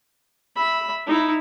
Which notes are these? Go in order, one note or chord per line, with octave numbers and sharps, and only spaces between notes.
E5 B5
D#4 E4